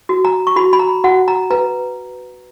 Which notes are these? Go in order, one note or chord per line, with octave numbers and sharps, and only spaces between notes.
F#4
A#5
C#6
F#4 B5
B5
A#5
F#4 F#5
A#5
B4 A#5